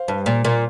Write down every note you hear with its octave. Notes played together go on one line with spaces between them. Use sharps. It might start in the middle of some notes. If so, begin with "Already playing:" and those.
Already playing: C5 F5
G2
A#2
A#2